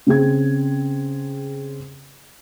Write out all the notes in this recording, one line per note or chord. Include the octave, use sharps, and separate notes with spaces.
C#3 C4 G#4 G#6